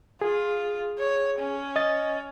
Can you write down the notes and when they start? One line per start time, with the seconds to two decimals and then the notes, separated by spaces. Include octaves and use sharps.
0.21 F4 G#4
0.99 C#5
1.39 C#4
1.76 D#5 A6